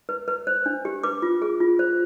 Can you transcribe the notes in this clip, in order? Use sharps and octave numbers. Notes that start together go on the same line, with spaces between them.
B4
B4
C5
D4
G4
B4 D6
F4
G#4
F4
C5